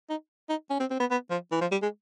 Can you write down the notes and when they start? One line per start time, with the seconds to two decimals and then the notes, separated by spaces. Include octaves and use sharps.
0.09 D#4
0.49 D#4
0.70 C#4
0.80 C4
0.90 C4
1.00 B3
1.11 B3
1.30 F3
1.51 E3
1.61 F3
1.71 G3
1.82 G#3